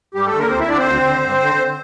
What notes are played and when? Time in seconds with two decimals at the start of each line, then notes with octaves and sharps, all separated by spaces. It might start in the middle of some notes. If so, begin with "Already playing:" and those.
0.14 G2 G3 G4
0.26 A3 A4
0.34 D3
0.39 A#3 A#4
0.50 D2 C4 C5
0.60 E4 E5
0.68 D3 D4 D5
0.77 C4 C5
0.87 D2
1.05 D3
1.23 G2
1.41 D3